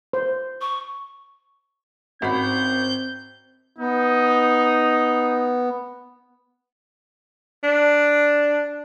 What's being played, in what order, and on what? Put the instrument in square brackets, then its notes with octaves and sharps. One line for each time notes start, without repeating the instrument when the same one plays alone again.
[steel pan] C5
[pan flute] C#6
[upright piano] G#1 B5 [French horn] C4 [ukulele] C#4 F#4 [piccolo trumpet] G6
[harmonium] B3 [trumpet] D#4
[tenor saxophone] D4